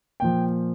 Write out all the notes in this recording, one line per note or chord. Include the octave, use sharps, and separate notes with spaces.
A#2 F3 G5